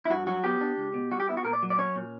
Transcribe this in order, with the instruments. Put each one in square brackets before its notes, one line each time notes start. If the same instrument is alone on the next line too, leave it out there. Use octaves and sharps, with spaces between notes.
[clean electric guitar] E4
G2 F#4
F#3 F#4
B3 G4
D4
C#2
B2
G3 F#4
G4
B3 E4
F#4
A#2 A#4
D5
F#3
D5
C#4 C#5
A#2